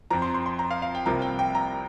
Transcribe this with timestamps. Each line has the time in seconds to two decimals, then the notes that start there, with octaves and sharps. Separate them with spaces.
0.10 F2 F3 C4 A#5
0.22 C6
0.34 C6
0.46 C6
0.59 A#5
0.71 F5
0.82 F5
0.95 G5
1.06 C2 C3 F3 A#3 A#5
1.22 G5
1.39 G5
1.55 A#5